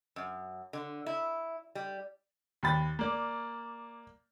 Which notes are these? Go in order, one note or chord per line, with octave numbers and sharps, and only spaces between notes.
F#2
D3
E4
G3
D#2 B5 A6
A#3 D5